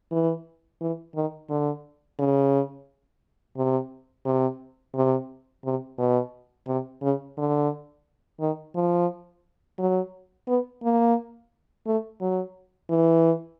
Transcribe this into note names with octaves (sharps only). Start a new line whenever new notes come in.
E3
E3
D#3
D3
C#3
C3
C3
C3
C3
B2
C3
C#3
D3
D#3
F3
F#3
B3
A#3
A3
F#3
E3